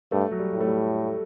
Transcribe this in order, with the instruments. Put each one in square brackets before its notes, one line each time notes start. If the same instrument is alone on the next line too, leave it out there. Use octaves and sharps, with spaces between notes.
[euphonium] G2 [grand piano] A3
[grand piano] F#3
G3
[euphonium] A2
[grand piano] A3
G3